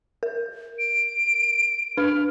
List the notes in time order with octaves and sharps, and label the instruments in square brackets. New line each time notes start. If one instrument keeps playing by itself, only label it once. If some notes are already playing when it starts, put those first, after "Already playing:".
[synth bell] A#4
[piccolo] D7
[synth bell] D4 B4 [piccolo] F6